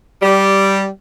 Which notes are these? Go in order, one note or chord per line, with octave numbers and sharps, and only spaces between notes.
G3